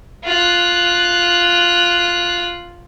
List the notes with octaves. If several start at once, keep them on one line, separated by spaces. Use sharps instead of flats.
F4 F#6